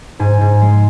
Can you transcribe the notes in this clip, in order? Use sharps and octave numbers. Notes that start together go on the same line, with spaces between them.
G#2 G#5
G#2
G#3